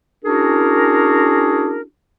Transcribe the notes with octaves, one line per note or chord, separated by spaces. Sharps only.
C#4 D4 E4 F#4 G#4 A#4